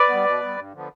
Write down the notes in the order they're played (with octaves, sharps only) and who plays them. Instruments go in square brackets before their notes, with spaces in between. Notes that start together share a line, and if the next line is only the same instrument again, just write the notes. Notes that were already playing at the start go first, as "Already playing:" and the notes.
Already playing: [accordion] B4 D5
G3 B3
B2
G3 B3
G2
D3 F3 B3